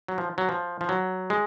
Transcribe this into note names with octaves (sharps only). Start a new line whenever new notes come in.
F#3
F3
F#3
F3
F3
F#3
G#3